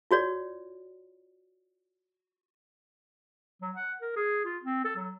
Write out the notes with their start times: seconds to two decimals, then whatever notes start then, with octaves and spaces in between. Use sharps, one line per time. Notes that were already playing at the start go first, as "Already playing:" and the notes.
0.11 F4 F#4 C#5 D5
3.61 F#3
3.76 F#5
4.01 A#4
4.16 G#4
4.45 F4
4.63 C4
4.85 A4
4.96 F#3